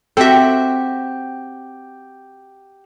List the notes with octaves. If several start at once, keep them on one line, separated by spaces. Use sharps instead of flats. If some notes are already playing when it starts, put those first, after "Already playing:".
C4 F#4 G4 A4 E5 G5